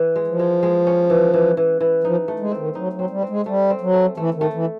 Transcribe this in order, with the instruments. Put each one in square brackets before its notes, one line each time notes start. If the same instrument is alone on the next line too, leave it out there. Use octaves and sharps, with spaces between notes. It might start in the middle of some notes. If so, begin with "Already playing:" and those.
Already playing: [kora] E3
G#3
[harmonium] F3
[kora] G#3
G#3
C#4
E3
E3
E3
E3
[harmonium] F3 [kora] D#4
[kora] A3
[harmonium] G#3
[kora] C4
[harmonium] D#3
[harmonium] F#3 [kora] D#4
[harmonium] F#3
[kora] C4
[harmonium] G3
[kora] C4
[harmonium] G#3
[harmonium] G3 [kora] A3
[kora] C4
[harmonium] F#3
[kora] A3
[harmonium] E3 [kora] A3
[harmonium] D#3
[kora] A3
[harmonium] E3